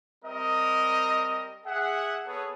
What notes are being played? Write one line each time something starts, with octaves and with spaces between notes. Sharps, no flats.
G3 C4 A#4 D#5
G#4 E5 F#5
B3 G#4 A4 B4 C#5